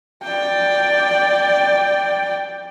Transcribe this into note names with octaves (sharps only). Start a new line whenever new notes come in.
D5 G5